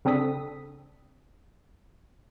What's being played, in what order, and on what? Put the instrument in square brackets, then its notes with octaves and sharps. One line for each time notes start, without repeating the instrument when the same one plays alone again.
[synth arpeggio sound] C#3 C4 D4 A4 D#6 B6